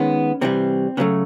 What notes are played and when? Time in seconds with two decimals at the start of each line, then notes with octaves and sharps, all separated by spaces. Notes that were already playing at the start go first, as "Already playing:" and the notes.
Already playing: D#3 G#3 B3 C#4
0.41 C3 E3 G3 C4
0.97 C#3 F#3 A3 B3